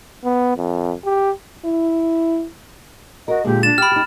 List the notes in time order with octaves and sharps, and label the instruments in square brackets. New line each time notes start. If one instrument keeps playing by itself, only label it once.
[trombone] B3
F2
G4
[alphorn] E4
[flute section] F#4 D#5 [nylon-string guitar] A#4
[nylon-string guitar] A#2 D3 G#3 [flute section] G4
[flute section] D4 [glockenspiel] A6 E7
[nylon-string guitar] G4 [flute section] G5 [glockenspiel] B5 F6
[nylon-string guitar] D#4 G4